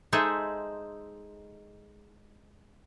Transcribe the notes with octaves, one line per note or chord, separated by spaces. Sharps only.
G#3 D#4 G#4 A4 C5 E5